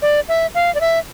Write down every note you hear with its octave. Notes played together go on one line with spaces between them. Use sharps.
D5
E5
F5
D5
E5